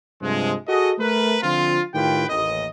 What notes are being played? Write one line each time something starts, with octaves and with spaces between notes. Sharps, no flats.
G2 C3 F3 G#3
F#4 G#4 A4 D#5
A3 A#4 B4
D3 F3 C4 F4
A2 D#3 F4 G4 B4 G5
A1 D#2 D#5